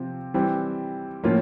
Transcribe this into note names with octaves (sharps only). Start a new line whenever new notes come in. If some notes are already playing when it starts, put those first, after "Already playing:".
Already playing: C3 F3 C4
E3 G3 C4
A2 F3 A#3 C#4 F4